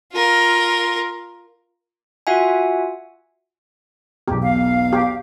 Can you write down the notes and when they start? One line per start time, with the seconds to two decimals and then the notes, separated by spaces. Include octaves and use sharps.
0.13 F4 A#4
2.27 F4 F#4 E5 F#5 G#5
4.28 B1 E2 G4
4.43 F5
4.93 G4